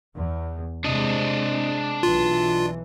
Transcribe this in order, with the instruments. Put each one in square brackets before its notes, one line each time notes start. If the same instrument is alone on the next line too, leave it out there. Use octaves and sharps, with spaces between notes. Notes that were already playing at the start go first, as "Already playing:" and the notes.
[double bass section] E2
[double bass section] C3 G#3 [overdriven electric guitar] D4 D#5
[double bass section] B1 E3 [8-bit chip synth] F4